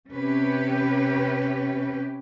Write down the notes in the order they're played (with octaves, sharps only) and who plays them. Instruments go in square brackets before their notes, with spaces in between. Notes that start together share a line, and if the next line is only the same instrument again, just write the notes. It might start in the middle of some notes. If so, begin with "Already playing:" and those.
[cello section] C3 C#4 G4 B4